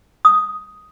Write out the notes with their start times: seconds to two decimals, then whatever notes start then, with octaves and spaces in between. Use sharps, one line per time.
0.25 D#6